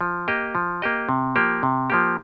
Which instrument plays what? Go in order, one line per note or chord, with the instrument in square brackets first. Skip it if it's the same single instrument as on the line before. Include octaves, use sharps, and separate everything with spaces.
[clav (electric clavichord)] F3
A#3 G4 D#5
F3
A#3 G4 D#5
C3
F3 A#3 G4
C3
F3 A#3 G4